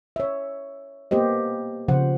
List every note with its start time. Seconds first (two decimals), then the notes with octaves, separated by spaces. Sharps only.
0.16 C#5 E5
1.11 A#3 B3 G4 C5 D#5
1.88 C#3 F3 C5 F#5